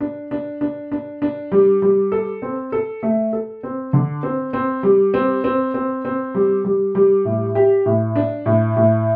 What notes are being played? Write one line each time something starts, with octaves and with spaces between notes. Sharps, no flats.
D4
D4
D4
D4
D4
G3
G3
A4
C4
A4
A3
A4
C4
D3
C4
C4
G3
C4
C4
C4
C4
G3
G3
G3
A2
G4
A2
D4
A2
A2